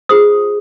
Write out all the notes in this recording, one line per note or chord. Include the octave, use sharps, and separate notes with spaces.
F4 G#4 C5 D#6